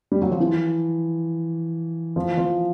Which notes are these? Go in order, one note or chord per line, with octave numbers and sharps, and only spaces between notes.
G3
F#3
F3
E3
F3
F3